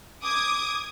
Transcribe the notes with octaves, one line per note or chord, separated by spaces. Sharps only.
D6 D#6 G#6